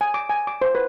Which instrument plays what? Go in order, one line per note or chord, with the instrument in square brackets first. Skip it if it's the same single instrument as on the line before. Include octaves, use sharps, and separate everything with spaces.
[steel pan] G#5
D6
G#5
D6
C5
B4